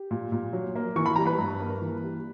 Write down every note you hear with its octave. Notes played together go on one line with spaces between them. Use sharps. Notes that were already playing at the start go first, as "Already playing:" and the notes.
Already playing: G4
A#2
A#2
F#3
A#3
E3 C#6
B5
G3 A#5
B4 B5
G2
A#3
E3
G3